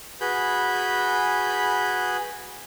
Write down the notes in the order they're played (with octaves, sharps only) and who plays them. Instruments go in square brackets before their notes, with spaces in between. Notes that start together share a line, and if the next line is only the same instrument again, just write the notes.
[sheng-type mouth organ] F#4 G#4 B4 G#5 B5 G6